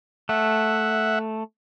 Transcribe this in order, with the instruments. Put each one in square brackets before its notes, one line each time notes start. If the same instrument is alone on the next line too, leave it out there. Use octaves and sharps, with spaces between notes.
[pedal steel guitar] A3 [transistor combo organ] E5 F#5